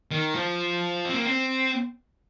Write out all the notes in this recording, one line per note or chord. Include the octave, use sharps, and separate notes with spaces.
D#3
F3
C4
A#3
C4